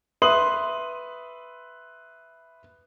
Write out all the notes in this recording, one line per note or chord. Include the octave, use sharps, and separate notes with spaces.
B4 E5 C6 D#6 F#7